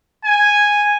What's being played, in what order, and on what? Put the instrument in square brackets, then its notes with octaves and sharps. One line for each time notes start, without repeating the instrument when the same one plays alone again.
[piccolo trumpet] G#5